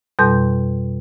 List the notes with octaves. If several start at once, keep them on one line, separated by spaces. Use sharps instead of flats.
F2 B2 G3 A4 C6 G6